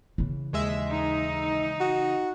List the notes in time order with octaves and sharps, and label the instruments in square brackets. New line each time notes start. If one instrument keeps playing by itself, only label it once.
[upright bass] C#3 E3
[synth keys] D#2 G#3 E5
[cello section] D#4
[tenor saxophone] F#4